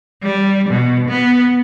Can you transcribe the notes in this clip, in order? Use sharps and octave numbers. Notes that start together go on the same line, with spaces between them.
G3
B2
B3